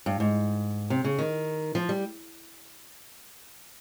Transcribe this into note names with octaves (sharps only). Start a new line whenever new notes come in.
G2
G#2
C3
C#3
D#3
F3
G3